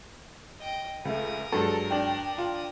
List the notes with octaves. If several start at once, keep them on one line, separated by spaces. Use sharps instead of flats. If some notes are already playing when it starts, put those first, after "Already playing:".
D#5 G5
C#2 A3 A#4 D#6
G2 F#3 G#3 A4
D4 G5
F4